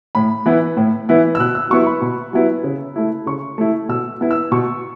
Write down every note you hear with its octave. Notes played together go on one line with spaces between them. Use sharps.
A2 B5
E3 B3 E4
A2
E3 B3 E4
E6
B2 F#6
E6
F#3 B3 E4 C#6
B5
B2
F#3 B3 E4
C#3
A3 E4
C#3 C#6
A3 E4
B2 E6
B3 E4
E6
B2 C#6